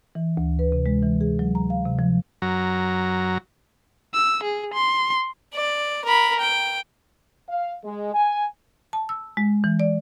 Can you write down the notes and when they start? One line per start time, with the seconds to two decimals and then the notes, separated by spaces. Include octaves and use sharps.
0.15 E3
0.37 D2
0.59 B4
0.72 C3
0.86 G#3
1.03 E3
1.21 G#4
1.39 F#3
1.55 A#5
1.70 F5
1.85 C3
1.99 F3
2.42 F#2 F#3 A#5
4.14 E6
4.44 G#4
4.74 C6
5.54 D5
6.04 A#4 B5
6.40 G5
7.49 F5
7.84 G#3
8.14 G#5
8.93 A5
9.09 E6
9.37 G#3
9.64 E3
9.80 D5